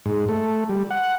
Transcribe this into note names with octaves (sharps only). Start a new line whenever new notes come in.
G#2
A3
G3
F#5